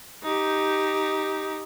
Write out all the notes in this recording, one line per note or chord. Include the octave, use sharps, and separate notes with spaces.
D#4 G4